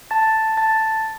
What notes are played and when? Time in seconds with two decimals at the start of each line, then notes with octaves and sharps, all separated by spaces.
0.11 A5 A6
0.57 A5 A6